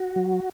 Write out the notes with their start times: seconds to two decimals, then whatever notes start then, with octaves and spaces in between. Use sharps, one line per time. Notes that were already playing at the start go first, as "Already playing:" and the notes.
Already playing: F#4
0.16 F#3